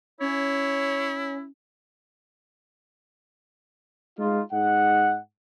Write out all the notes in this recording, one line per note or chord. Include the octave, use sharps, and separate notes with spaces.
C#4 E4 C#5
G#3 D#4 F4
G#2 D#5 F#5